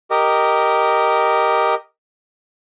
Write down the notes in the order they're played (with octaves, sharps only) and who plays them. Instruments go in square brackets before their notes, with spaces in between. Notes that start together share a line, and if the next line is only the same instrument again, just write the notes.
[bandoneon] G4 A#4 D#5